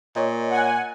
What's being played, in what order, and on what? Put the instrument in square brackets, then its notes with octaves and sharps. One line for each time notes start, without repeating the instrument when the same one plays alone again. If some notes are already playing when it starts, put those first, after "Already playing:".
[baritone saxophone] A#2 [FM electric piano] C#5 D#5
[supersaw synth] F#5 G#5